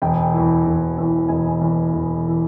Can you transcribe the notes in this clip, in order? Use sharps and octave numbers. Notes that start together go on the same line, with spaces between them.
E1 G5
E2 E3
E1
E2 E3
E1 G#5
E2 E3
E1
E3